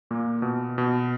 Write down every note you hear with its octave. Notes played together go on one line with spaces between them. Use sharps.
A#2 A#3
B2
B2